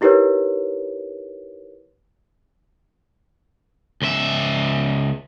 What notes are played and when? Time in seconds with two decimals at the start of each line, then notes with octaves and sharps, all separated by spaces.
0.01 D#4 E4 G4 A#4 B4 C#5
4.02 C#2 E5